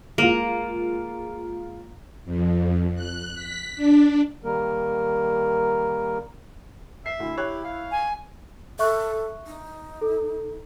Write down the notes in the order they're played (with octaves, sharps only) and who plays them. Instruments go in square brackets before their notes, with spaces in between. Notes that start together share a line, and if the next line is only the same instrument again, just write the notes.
[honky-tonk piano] G#3 F4 [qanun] A#3
[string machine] F2
F#6
B6
D4
[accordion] D#3 G3 A#3 A#4
[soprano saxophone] E5 [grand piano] C7
[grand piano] D2 [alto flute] E4
[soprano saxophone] G4 [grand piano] C#5 F#6
[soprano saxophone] F5
[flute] G#5
[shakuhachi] A4 [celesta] E5 C#6 F#6
[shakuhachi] D#4
[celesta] A4